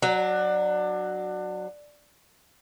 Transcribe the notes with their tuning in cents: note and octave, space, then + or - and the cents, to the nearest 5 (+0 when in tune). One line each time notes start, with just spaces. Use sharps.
F#3 +0 D4 +25